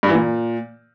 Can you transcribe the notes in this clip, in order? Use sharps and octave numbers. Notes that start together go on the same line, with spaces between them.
G2
E3
A#2